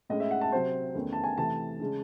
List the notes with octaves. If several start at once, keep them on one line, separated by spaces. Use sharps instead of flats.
A2 G#3 C#4 D#5
E5
F#5
A5
C3 F#3 C4 C5
E2 D#3 A3 C#4
A5
G#5
C3 E3 A3 A5
C#3 G#3 C#4